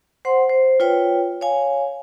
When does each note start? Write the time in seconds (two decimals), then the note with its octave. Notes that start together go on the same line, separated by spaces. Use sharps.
0.25 C5 F#5 C6
0.50 C5
0.80 F4 B4 C#5 G5
1.41 C#5 F5 G#5